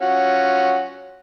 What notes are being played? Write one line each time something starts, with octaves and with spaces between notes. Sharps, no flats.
C#4 F4 F#4